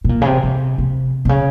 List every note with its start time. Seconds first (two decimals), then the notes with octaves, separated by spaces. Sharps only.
0.04 B2
0.09 A#2
0.22 C#3
0.27 C3
0.43 C3
0.78 C3
1.25 C3
1.29 C#3